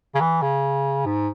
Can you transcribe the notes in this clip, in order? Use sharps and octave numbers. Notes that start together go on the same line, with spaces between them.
C#3
E3
C#3
G#2